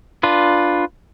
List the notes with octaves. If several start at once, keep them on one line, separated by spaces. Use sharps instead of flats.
D4 F4 B4